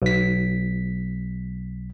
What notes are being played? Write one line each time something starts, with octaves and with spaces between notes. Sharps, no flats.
B1 B6